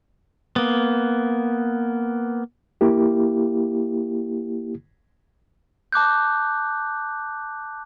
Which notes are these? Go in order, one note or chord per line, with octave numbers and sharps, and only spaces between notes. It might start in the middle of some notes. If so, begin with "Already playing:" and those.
A#3 B3
A#3 E4 G4
A5 D6 F#6 G6